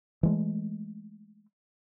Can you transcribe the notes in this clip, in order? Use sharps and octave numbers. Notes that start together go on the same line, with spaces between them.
E3 G#3 A3